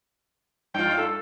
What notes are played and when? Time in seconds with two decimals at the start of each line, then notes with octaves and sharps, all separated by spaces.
0.74 G2 F4 G5
0.98 A4